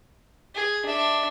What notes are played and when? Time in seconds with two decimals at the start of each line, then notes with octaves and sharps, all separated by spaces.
0.55 G#4
0.85 D4 E5